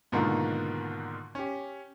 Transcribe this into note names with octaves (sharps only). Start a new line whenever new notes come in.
G#2 B2 D3 D#3 A#3 F4
C#4 G4